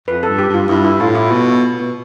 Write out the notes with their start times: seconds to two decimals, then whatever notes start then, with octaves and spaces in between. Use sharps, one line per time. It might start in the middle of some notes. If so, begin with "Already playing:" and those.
0.08 F2 B4
0.23 A4
0.28 G2
0.39 G4
0.49 G2
0.54 F4
0.69 G2 E4
0.84 E4
1.00 A2 F4
1.15 E4
1.31 B2
1.80 B2